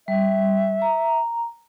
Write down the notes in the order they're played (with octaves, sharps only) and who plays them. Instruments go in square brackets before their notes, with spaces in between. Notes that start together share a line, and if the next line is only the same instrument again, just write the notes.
[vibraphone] G3 [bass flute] E5
[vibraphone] A#5